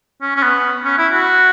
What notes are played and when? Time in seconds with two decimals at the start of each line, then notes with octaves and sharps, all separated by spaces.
0.22 C#4
0.36 C#4
0.43 B3
0.84 C#4
0.98 E4
1.12 F#4